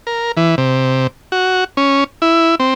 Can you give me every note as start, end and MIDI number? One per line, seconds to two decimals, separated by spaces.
0.07 0.32 70
0.37 0.55 52
0.58 1.07 48
1.32 1.64 66
1.77 2.04 61
2.22 2.55 64
2.60 2.74 60